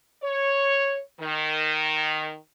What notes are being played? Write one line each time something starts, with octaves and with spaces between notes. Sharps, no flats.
C#5
D#3